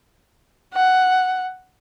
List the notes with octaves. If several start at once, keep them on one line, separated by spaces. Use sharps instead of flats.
F#5